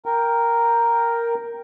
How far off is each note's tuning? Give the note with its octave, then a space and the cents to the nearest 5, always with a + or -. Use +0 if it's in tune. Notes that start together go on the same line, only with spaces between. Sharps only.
A#4 +0 G5 +0